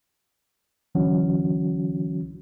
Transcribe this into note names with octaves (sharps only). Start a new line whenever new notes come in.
C2 D3 E3 F#3 C#4 F#4